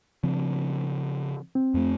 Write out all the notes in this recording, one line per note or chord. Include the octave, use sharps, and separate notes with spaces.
C#3 F3 C4
C4
F2 A3